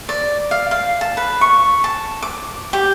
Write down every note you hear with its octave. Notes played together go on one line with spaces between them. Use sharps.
D5
F5
F5
A5
B4
C#6
A5
D6
G4